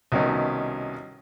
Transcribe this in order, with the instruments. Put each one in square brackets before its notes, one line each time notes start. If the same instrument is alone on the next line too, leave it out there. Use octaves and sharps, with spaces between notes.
[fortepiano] C2 B2 D#3 C#4